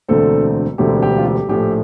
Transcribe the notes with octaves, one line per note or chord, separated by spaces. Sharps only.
E1 D2 D3 A3 C4 A4
E1 D2 D3 A3 C4 G4
G4
F4
G4
A#1 A2 F3 A3 G4